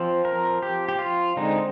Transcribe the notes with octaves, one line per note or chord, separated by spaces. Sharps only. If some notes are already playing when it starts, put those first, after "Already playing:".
Already playing: F3 C4
A#4
G4
G4
F4
D3 G#3 C4 D#4